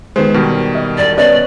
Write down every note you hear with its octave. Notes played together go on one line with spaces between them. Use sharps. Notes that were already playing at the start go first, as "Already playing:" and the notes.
D#3 G#3 B3 C5
B2 D#3 G3 A#4
D#5
E1 D5
B3 C#4 D5 D#5